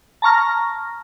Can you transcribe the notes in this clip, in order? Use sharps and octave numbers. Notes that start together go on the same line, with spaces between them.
A5 A#5 C#6 F6 A#6